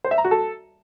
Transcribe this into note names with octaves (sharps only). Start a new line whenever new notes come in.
C5
E5
A#5
F#4
A4